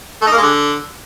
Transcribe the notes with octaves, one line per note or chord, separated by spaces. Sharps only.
A3
D#4
A#3
G#3
D3